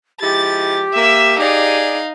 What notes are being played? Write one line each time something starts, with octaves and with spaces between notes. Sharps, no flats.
F3 G#3 E4 G4 A6
A#3 E5 E6
D#4 G#4 D5 F5